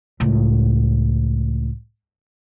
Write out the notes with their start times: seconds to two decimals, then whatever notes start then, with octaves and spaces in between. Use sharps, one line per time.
0.20 C#2 A2